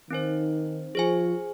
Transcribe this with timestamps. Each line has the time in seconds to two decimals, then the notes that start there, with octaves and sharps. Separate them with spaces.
0.10 D#3 C4 D#4 C5
0.95 F3 G#4 C5 G#5